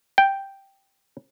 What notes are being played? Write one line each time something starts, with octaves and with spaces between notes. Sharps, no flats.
G5